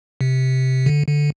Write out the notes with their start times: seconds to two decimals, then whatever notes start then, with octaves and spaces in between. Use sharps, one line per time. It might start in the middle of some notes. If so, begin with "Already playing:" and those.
0.21 C3
0.86 D3
1.08 D3